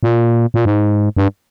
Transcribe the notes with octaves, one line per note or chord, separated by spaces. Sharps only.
A#2
A#2
G#2
G2